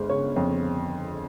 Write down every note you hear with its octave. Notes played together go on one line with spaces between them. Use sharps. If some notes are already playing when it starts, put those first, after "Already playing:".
Already playing: G1 G#3 C5
C#3 C#5
F2 C#5